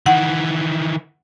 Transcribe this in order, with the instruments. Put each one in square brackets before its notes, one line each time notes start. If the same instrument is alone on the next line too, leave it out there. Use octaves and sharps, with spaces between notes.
[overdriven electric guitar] D#3 E3 [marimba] F#5